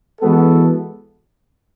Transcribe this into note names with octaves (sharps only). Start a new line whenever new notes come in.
E3 G#3 B3 F#4 A4